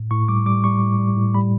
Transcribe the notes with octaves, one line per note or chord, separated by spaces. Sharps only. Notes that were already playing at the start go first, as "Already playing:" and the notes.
Already playing: A2
A2 C#6
G3 D6
G3 D6
G3 C#6
A2
G3
A2
G3 B5